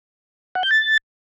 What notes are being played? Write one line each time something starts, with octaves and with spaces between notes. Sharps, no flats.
F#5
G6
A6